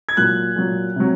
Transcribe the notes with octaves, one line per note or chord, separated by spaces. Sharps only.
G#6
A#2 F#3 F#6
A#2 F#3
C3 F#3